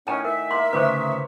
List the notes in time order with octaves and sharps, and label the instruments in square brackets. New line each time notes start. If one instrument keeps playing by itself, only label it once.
[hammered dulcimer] A2 D#3 [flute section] C#4 [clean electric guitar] F#5 G#5
[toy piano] A#4 [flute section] E5
[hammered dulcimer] A#3 A#4 [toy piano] C6
[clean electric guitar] D2 A2 C#3 [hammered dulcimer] D#4 F4 [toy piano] B4 C5
[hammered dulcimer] C#5